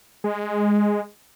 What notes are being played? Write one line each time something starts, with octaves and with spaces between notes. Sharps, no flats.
G#3